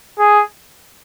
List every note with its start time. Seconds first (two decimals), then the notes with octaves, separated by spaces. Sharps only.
0.19 G#4